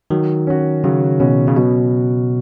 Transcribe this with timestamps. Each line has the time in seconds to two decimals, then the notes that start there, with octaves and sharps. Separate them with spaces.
0.10 D#3 F#3
0.47 C#4 F#4
0.84 C#3 F#3
1.20 B2 C#4 F#4
1.47 C#3
1.57 B2 F#3